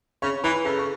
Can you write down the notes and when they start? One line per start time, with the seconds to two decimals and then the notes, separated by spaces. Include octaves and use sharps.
0.22 C#3 C#5 C#6
0.44 E3 B4 B5
0.65 C#3 A4 A5
0.79 C#6